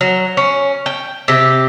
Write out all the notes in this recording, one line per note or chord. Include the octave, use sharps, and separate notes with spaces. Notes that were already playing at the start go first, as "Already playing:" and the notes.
F#3
C#4
G5
C3 G4